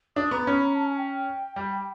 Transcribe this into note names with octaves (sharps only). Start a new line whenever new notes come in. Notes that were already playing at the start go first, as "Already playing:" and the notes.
D4 D#6
B3 A#5
C#4 B5
A#5
A5
G#5
G5
G3